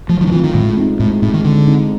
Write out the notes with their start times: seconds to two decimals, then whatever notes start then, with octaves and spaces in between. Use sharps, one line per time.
0.09 F3 A3
0.21 F3
0.27 D#3
0.32 E3 F4
0.36 C4
0.44 D#3
0.54 A2 G#3
0.77 C4 D#4
1.00 A2 G#3
1.22 A2 C4 D#4
1.34 D#3
1.44 D3 G#3
1.67 C4 D#4